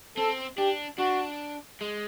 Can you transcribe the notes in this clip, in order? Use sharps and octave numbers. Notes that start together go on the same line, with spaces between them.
C4 A4
D4 G4
D4 F#4
G#3